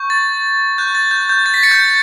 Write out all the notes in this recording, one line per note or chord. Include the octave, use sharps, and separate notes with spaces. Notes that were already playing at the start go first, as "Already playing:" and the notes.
Already playing: C#6 G6
A6
C#6 F#6 G6
A6
G6
G6
A6
B6
A6 C#7
G6